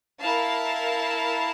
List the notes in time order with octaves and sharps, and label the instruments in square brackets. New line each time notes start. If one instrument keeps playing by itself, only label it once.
[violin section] E4 A#4 F5 A5